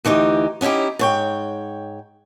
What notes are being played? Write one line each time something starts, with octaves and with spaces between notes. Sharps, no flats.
D2 E3 D#4 G4
B3 C#4 D#4 E4 G4
G#2 C#5 G5